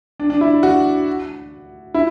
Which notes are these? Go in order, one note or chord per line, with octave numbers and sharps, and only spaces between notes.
D4
D4
E4
F#4
E4